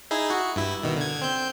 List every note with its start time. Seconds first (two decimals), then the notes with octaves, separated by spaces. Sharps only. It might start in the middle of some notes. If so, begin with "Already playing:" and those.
0.11 D#4 E4 G#4
0.30 F#4
0.56 G2 E4
0.83 B2 D#3
0.97 D3 G#6
1.22 C4 G6